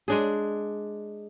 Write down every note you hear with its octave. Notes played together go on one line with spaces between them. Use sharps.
G#3 D4 G#4